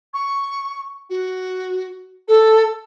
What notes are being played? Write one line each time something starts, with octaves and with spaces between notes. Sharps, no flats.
C#6
F#4
A4